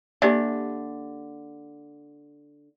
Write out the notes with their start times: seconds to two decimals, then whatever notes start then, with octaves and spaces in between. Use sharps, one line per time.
0.22 D3 A#3 G4 D5 E5